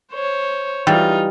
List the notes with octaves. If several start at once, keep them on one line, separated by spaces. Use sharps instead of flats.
C5 C#5
E3 G3 D#4 F4